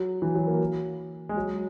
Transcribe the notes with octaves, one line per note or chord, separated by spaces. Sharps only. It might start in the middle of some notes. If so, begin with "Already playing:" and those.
Already playing: F#3
E3
F#3
A#3
G#3
F#3